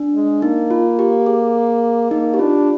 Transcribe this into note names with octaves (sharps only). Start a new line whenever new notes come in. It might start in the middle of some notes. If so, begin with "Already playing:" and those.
Already playing: D4
G#3
A#3 D#4
F4
G4
G#4
A#3 D#4
G4
D4 F4